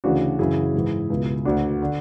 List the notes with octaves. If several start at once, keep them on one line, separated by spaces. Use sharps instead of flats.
D2 C#3 E3 D4 F#4
F#2 C#3 E3 E4 G#4
G#2 E3
C#2 B2
D2 D3 D4 F#4
D3